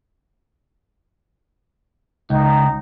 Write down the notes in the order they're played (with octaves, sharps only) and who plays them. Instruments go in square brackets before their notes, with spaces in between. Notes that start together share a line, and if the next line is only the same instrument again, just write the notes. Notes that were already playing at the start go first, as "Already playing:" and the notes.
[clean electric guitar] C#2 [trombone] D#4